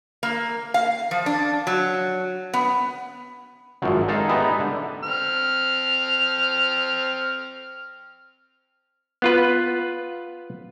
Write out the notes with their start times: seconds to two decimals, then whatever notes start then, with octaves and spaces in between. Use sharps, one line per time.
0.23 A#3
0.74 F5
1.11 F3
1.26 D4
1.67 F#3
2.53 B3
3.82 G#1 F#2 F3 F#3
4.08 G#3 D#4 A4 F5 A5
4.29 G3 G#3 B3 D#4 E4
4.59 D3
5.03 C4 F6
9.22 B3 F4 B4